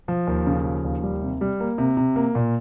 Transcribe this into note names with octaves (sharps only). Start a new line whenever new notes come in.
F3
D#2
C#3
F3
D#2
G3
C3
G3
A#3
C3
C3
A#3
A#2